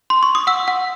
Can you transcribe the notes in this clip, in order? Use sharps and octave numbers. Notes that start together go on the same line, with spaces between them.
C6
C#6
D#6
F#5 E6
F#5